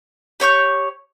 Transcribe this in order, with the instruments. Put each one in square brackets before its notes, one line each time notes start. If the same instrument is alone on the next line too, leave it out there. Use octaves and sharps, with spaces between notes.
[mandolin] G4 C#5 C#6 G6